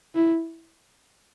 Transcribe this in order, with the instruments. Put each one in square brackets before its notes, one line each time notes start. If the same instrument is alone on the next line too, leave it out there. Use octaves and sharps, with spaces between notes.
[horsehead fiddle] E4